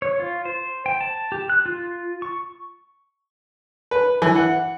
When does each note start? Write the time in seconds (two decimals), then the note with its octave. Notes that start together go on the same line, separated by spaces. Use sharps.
0.02 C#5
0.20 F4
0.45 C5
0.86 G5
1.01 A5
1.32 G4
1.50 F#6
1.66 F4
2.22 C#6
3.91 B4
4.22 E3
4.35 F#5